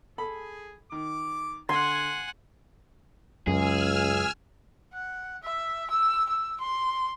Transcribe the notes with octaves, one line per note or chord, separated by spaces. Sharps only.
G#4 A4 B5
D#3 D6
D3 F#5 G#5 C6 G#6
C#2 F#2 G#4 G#5 E6 F6
F#5
E5
E6
E6
C6